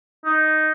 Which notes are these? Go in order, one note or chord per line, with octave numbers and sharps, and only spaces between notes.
D#4